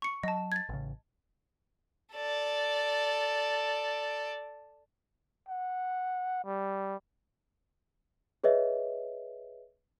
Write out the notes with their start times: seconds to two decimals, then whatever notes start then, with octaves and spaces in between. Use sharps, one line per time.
0.02 C#6 C#7
0.23 F#3 D#5 A5
0.52 G#6 A6
0.69 A1 C#3
2.15 A4 D5
5.49 F#5
6.45 G3
8.44 G#4 B4 C#5 D#5 E5